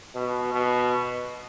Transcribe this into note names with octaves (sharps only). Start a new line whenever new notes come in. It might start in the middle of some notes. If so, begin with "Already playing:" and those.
B2
B2